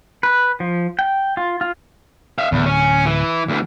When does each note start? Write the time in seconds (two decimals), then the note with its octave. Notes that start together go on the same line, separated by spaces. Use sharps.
0.23 B4
0.60 F3
0.99 G5
1.37 F4
1.61 F4
2.38 E5 F5
2.52 D1 E2
2.65 C#4
3.06 E3
3.48 D2 E3